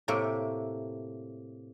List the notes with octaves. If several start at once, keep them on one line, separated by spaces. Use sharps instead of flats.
A2 C3 A3 A#3 G4